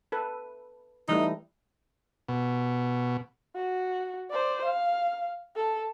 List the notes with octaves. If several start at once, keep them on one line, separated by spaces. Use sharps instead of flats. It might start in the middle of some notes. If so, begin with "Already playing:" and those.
A4 B4
E3 G3 A3 D#4
B2
F#4
C5 D5
F5
A4